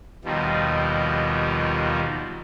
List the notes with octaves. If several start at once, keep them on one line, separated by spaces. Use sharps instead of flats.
D#2 B2 D#3 F3 G3